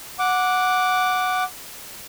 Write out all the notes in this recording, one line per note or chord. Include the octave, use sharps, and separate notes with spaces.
F#5 D6